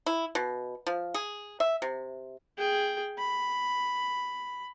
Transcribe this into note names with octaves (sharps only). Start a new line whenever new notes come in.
E4
B2
F3
G#4
E5
C3
G#4 G5
B5